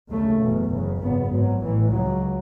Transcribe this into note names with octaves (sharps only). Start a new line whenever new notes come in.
D#2 C#3 A3
F#1 E2 B2
F#1 E2 C#3
G#1 F#2 C#3 B3
G#1 G#2 F#3
A1 A2 E3
C#2 C#3 F#3